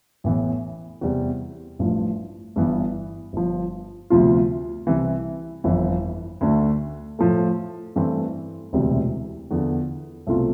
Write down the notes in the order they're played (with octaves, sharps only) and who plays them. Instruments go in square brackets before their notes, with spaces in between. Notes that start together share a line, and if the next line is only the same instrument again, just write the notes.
[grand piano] A1 A2 E3 B3
E2 C3 G3 C4
A1 G2 F3
G1 G2 E3 B3
G1 G2 F3
D2 C3 F3 B3 F4
C2 C3 E3
G1 F2 E3
D2 D3 A3
A2 F3 A3
G2 E3 A3 C4
E1 D2 C3 E3 G3
E2 D3 F3 B3
C2 B2 A3 C4 F4